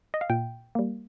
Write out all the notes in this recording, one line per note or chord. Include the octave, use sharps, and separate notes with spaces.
D#5
F5
A#2 G5
G3 A#3